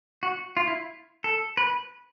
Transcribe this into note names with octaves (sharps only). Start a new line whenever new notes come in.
F#4
F4
E4
A4
B4